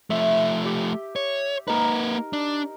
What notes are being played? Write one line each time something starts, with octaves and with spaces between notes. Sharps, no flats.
F3 A3 E5
G4
C#5
A#3 D#4 A#4 B4
D4